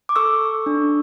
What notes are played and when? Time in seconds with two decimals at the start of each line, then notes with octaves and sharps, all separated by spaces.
0.09 D6
0.16 A4 C#6 E6
0.41 A4
0.66 D4